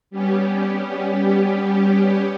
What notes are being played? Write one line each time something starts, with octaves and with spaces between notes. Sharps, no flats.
G3 B3 C#4 G4